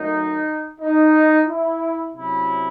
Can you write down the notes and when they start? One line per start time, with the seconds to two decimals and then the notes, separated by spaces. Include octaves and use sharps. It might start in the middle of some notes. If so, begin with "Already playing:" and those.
Already playing: F#2 D#3 F#3 A3 D#4
0.81 D#4
1.47 E4
2.14 C3 F#3 C#4 E4